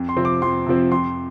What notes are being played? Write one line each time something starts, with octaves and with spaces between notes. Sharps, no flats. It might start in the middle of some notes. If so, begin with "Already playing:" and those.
Already playing: F2
C6
C3 F3 C4
D6
F2 C6
C3 F3 C4
F2 C6